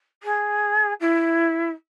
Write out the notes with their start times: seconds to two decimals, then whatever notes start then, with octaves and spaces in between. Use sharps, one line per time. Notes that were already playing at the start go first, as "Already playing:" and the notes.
0.23 G#4
1.00 E4